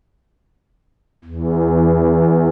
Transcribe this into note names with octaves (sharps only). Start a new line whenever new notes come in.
E2